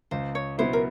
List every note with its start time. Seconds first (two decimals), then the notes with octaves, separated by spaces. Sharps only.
0.11 C#2 C5
0.35 C#5
0.58 B2 F#3 B3 E4 C5
0.73 A#4